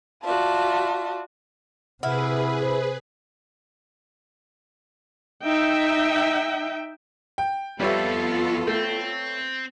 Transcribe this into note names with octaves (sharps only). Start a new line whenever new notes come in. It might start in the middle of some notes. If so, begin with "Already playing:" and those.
F4 F#4 D5 E5 A5
C3 E4 G#4 B4 F#5 F6
C5
D#4 E5 G5
G5
F2 G3 B3 F4 A4 B4 C#5 E5
A3 C4